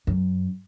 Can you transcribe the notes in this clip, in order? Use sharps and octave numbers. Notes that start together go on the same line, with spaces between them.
F#2